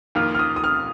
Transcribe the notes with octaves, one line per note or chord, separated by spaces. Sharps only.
F2 D#3 A#3 F4 F6
F6
D#6
D#6
F6